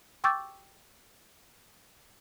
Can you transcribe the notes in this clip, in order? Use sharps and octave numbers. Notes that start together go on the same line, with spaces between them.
G5 C#6 D6 E6 G6 A6